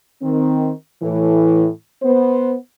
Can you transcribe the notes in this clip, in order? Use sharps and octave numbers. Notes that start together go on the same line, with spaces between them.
D#3 C4
A2 E3
B3 C5